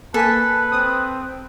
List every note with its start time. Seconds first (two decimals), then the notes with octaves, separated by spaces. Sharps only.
0.14 A#3 A4 B4 G#5 A5 B6
0.72 C4 D#6